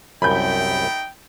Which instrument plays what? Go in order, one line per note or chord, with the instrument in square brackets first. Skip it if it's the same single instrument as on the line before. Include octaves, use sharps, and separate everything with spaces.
[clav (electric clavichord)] C2 F#2 [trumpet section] A3 D#4 G5 [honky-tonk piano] B5 G6